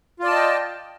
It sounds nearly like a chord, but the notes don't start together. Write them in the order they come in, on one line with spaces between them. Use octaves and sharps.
F4 D5 A5 D#5 G5